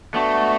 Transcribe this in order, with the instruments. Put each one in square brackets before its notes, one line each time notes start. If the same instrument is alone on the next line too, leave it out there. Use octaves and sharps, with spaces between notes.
[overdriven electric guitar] A3 [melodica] B3 D4 F#4